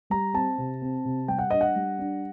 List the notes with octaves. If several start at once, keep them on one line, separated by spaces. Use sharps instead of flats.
G3 A#5
C4 A5
C3
C4
C3
G3 G5
F#5
D4 D#5
F#5
G3
D4